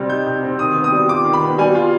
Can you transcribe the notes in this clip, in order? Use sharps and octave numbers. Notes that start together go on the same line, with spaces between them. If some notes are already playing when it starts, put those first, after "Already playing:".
Already playing: C3 G3 C4
D#4 G6
C3
C4
D#3 D#6
B3
D#6
G3
F4 D6
D#3
B5
B3
G3 G#5
F4